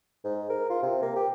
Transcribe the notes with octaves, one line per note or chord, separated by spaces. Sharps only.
G#2
A#4
F4
C3
A#3
G4